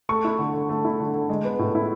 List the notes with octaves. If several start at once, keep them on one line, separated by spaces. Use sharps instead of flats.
A3 C#6
E4
D3
D3
A3
E4
D3
D3
G#3
B3
A2
E4